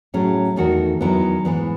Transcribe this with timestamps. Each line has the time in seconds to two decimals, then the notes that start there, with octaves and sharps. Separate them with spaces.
0.14 A2 F#3 C#4 G#4
0.56 E2 D#3 A3 D#4 F#4
1.01 E2 D#3 F#3 B3 E4
1.45 G#2 E3 B3